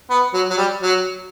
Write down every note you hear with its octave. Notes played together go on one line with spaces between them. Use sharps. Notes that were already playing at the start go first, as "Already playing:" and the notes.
B3
F#3
F#3
G3
F#3